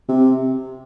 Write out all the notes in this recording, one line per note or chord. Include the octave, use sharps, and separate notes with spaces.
C3